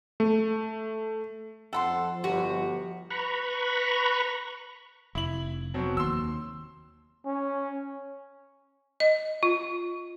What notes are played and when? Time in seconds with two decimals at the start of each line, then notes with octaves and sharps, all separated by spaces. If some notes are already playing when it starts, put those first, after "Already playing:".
0.20 A3
1.73 F2 F3 A4 F#5 B5 C6
2.24 G1 F#4 G4
3.10 B4 A#5 B5 C#6
5.15 F1 E4 F#7
5.74 B2 F#3 C4
5.97 D#2 C6 E6
7.26 C#4
9.00 D#5
9.43 F4